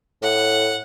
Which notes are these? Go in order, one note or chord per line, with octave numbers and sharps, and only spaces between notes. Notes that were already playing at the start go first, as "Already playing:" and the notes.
A2 F#5